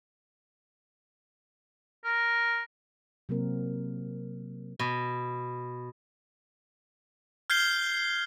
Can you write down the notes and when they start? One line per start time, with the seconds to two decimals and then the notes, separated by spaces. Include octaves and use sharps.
2.05 A#4
3.29 C3 F#3 A#3 C4 A#4
4.79 B2
7.50 F6 G6 G#6 C7 G7